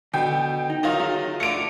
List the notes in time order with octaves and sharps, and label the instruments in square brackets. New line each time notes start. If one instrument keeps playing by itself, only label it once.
[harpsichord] B2 [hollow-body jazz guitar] D3 [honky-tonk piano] G5
[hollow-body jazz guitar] D#4
[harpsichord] D#3 F#3 [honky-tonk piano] F4 A#6
[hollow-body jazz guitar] F#4 G#4 E5
[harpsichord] D3 A3 [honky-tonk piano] C#7 D7